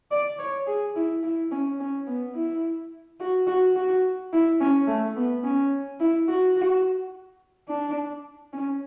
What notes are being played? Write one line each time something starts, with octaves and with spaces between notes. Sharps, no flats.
D5
C#5
G#4
E4
E4
C#4
C#4
B3
E4
F#4
F#4
F#4
E4
C#4
A3
B3
C#4
E4
F#4
F#4
D4
C#4